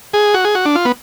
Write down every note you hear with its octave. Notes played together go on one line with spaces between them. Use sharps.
G#4
F#4
G#4
F#4
D4
F4
B3